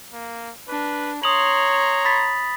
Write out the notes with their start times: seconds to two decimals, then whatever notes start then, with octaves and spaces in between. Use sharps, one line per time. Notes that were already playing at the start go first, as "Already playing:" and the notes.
0.13 A#3
0.68 D4 B4
1.23 C#5 A#5 C6 D#6 F7 F#7
2.05 B5 A6 B6